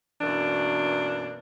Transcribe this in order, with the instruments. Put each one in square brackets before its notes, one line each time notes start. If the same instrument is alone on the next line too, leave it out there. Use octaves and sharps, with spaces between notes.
[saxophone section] F#2 B2 E3 A#3 D4